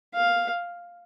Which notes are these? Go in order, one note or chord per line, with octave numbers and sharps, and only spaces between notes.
F5